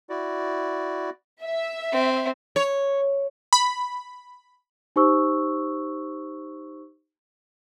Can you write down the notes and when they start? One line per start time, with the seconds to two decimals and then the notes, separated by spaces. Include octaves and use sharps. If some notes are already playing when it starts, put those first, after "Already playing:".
0.10 E4 F#4 D5
1.43 E5
1.92 C4
2.56 C#5
3.53 B5
4.96 D#4 G4 C5 C#6 E6